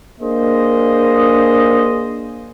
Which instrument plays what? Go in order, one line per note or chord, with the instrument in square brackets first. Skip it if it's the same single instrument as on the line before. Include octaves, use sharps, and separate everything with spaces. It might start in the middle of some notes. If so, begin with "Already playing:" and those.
[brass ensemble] A#3 D4 G#4 C5 D#5